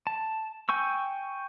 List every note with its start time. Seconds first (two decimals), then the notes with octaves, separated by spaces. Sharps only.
0.07 A5
0.69 G5 G#5 C#6 E6